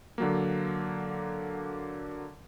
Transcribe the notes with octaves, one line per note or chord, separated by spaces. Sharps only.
D3 F#3 A#3